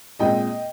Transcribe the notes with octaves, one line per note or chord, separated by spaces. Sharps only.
A#2 G#3 C4 D#5 G5